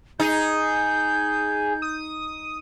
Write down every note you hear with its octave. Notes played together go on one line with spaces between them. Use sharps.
D#4 G#4 G6
D#6